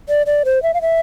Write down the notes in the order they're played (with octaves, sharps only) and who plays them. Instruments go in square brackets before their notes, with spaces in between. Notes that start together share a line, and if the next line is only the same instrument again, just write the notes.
[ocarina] D5
D5
C5
E5
F5
E5